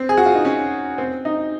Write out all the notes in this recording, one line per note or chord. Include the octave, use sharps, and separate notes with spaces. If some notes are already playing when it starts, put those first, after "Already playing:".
Already playing: C4
G#4
F#4
F4
D#4
C#4
C4
D#4